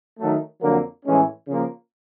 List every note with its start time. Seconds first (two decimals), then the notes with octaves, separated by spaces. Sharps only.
0.18 D#3 F#3 A3
0.61 F2 D3 F#3 A#3
1.05 A2 E3 G#3 C#4
1.47 C#3 F3 A#3